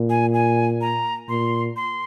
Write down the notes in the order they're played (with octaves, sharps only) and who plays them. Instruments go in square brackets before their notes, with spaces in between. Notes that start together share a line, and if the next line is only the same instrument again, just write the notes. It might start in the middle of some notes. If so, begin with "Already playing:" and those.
Already playing: [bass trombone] A#2
[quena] G#5
G#5
A#5
[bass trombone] A#2 [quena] C6
[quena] C6